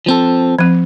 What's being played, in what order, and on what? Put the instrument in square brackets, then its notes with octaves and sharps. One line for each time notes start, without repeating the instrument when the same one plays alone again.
[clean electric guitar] F3 C4 A4
[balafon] F3 C4